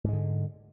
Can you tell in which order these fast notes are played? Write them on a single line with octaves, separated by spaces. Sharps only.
G#2 G#3 D3